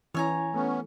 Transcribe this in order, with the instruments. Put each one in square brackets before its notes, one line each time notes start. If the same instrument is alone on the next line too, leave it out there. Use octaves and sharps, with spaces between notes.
[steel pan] E3 C#4 [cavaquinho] C#5 G#5 A#5
[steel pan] A3 [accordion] B3 C#4